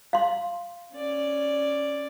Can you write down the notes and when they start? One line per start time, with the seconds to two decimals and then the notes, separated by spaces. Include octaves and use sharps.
0.13 F5 C6
0.94 C#4 D5